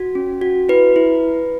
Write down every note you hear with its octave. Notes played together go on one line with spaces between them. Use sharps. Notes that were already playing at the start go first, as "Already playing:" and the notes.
Already playing: F#4
C#4
F#4
E4 B4
E4